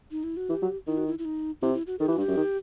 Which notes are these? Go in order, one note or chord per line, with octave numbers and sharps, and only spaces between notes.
D#4
E4
F#4
E3 G4
F#3
D#3 E4
F#4
E4
E4
D#4
C3 E4
E4
F#4
D#3 A4
E3 G4
F#4
G2
G4
F#2
D#3